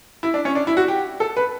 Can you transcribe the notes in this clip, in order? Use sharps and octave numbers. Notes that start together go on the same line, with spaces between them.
E4
D4
C#4
D4
E4
F#4
G4
A4
B4